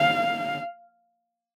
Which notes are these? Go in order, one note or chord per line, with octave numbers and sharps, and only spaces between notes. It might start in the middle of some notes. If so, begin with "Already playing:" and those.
Already playing: F5